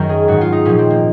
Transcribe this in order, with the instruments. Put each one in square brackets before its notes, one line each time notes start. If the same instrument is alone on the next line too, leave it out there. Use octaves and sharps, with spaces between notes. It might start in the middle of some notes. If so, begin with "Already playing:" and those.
Already playing: [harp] F#2 D#3 A#4
G#4
G#2 D#3 F#4
F4
D#4
A#2 F3 C#4
C4
A#3